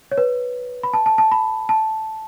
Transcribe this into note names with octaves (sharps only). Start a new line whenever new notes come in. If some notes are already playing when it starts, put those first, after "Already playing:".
C#5
B4
B5
A5
A5
A5
B5
A5